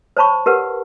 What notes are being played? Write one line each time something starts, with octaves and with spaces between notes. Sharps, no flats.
C5 C#5 A5 B5 C#6
G4 A#4 B4 F#5